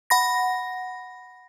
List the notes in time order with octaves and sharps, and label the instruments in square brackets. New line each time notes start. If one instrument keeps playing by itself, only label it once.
[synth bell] F#5 B5 A#6